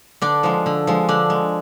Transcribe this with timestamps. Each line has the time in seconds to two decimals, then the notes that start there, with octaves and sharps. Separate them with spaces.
0.22 D3 D4
0.43 F3 G#3
0.66 D3
0.87 F3 G#3
1.09 D3 D4
1.30 G#3